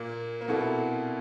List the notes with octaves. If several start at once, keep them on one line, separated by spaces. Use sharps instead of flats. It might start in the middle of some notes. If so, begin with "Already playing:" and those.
Already playing: A#2 A#3
A#3
B2 B3 C4 E4 A4 D5